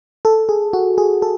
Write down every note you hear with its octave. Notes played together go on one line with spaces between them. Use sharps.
A4
G#4
F#4
G#4
A4